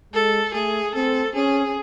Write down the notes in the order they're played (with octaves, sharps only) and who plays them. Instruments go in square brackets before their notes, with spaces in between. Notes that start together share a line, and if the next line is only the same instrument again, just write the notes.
[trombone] G#3 [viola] A4
[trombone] A3 [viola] G#4
[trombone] C4 [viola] A4
[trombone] C#4 [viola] G#4